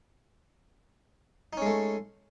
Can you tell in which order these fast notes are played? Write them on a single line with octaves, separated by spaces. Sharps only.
D#4 C#4 G#3 A3